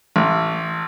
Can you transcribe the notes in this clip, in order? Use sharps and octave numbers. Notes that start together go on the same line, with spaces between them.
A1